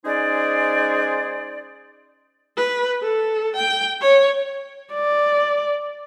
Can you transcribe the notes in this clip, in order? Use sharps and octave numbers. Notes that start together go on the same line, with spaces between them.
G#3 C#4 D#4 G#4 C5 D5
B4
A4
G5
C#5
D5